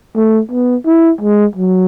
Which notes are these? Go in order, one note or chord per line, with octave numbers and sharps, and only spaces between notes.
A3
B3
E4
G#3
F#3